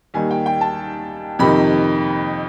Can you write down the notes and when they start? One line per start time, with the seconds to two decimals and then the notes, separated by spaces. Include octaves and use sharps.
0.14 D#2 D#3 G3 G#5
0.31 G5
0.46 G5
0.61 A5
1.39 F2 C3 D#3 B5